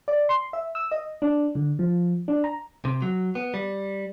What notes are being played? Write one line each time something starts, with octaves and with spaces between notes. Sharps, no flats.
D5
C6
E5
E6
D#5
D4
D3
F3
D4
A#5
C3
F#3
B3
G3